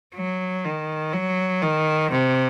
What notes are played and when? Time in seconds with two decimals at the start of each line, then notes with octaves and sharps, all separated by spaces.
0.15 F#3
0.64 D#3
1.13 F#3
1.62 D#3
2.11 C3